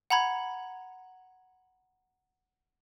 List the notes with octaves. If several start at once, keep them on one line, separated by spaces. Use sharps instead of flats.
F#5 A#5 B5 G#6